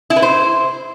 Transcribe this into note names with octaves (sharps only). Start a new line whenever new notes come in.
E4
B4
C5